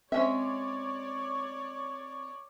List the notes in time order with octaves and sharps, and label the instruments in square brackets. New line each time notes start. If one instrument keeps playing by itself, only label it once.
[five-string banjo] G#3 C#4 E5 [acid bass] C4 [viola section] C#5 D5